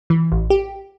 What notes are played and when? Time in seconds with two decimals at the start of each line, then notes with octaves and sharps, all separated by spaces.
0.10 E3
0.32 A1
0.50 G4